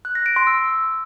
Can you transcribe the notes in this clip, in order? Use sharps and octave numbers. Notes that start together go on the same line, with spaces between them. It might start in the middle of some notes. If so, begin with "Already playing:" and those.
F#6
A#6
D7
C6
E6